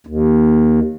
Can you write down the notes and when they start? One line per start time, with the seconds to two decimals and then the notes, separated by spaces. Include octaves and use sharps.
0.07 D#2